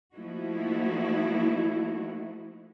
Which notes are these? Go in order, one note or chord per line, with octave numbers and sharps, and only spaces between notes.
F3 A3 A#3 D#4 E4 F#4